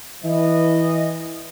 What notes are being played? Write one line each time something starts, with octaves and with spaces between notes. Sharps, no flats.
E3 D#5